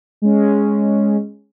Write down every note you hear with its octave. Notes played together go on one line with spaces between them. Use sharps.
G#3 C#4